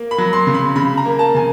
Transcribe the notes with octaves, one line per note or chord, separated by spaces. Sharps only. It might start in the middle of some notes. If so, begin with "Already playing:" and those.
Already playing: A#3
B5
F#3
C6
C#3
B5
C#3 B5
A#5
A#3
A5
C#3 G#5